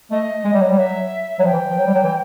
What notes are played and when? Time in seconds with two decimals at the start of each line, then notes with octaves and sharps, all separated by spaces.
0.11 A3 D#5
0.45 G#3
0.53 G3
0.61 F#3
0.70 G3
0.78 F#3 E5
1.39 F#3
1.44 F3 G5
1.53 E3
1.70 F3
1.78 F#3
1.86 G3
1.95 F#3
2.03 E3